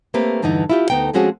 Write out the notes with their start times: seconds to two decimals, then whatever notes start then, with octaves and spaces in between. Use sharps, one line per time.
0.14 A3 A#3 C4 G4 B4
0.42 E2 G2 D3 E3 D#4
0.70 E4 F4 G4
0.90 D2 B3 D#4 G5
1.13 F3 G#3 C4 C#4 F#4 G#4